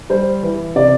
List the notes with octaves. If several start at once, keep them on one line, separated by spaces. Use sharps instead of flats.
G3 C5
E3
C3 D5